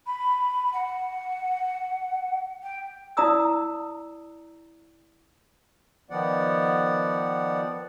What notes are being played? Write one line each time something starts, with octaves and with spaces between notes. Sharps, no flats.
B5
F#5
G5
E4 D5 A#5 D#6 E6
D#3 F3 B3 D5 F#5